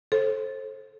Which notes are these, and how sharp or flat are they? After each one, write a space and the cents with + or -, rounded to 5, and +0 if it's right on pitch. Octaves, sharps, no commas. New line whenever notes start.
A4 -15 C5 +30